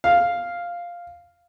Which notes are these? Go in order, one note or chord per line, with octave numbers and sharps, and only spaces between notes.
F5